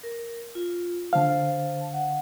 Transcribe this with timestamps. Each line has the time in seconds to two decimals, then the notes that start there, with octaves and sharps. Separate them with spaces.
0.03 A#4
0.55 F4
1.13 D3 C5 F5 A5
1.93 F#5